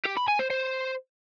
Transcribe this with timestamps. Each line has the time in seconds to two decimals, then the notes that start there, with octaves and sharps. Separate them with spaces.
0.06 G4
0.17 B5
0.28 G#5
0.39 C5
0.50 C5